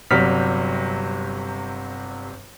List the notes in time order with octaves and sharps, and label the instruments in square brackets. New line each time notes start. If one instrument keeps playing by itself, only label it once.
[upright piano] G1 C3 F#3 G3 F6 B6